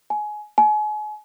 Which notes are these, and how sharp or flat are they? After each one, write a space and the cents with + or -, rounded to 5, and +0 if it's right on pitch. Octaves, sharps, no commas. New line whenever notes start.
G#5 +20
G#5 +35